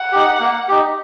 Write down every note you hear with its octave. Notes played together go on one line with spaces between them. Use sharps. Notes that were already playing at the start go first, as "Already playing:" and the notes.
Already playing: F#5
D#4 G4
A#3
D#4 G4